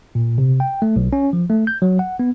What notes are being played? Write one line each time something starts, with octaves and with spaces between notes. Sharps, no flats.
A#2
C3
G5
A3
B1
C#4
F3
A3
G6
F#3
F#5
B3